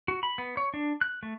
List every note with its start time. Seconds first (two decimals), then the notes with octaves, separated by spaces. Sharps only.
0.08 F#4
0.23 B5
0.38 B3
0.57 C#5
0.74 D4
1.01 F#6
1.23 A3